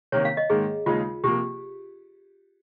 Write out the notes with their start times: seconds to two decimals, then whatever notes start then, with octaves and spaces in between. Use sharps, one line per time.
0.12 C3 D#3 A#3 C#4 C#5
0.25 F5
0.37 D#5
0.50 G#2 D#3 A#3 G#4
0.86 D#2 C#3 G#3 D#4 F4
1.24 C3 F3 A#3 G4